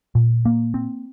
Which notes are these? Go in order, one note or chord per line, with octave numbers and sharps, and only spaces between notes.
A#2
A#3
C4